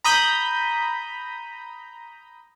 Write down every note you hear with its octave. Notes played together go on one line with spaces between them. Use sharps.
A#5 B5 D#6 G6